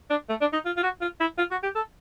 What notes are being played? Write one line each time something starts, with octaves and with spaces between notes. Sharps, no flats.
D4
A3
D4
D#4
F4
F4
F#4
F4
E4
F4
F#4
G4
A4